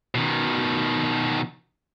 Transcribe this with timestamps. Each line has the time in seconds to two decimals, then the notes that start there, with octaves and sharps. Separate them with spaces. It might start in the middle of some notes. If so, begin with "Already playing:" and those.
0.15 B2 D#3